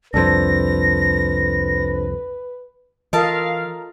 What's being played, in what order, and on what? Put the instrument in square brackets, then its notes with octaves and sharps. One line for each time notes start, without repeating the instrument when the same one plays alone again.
[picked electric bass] C2 F2 [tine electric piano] D4 A4 C5 [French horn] B4 [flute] A#6
[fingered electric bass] E3 [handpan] F4 A4 D#5 [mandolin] A#4 A5 [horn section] F5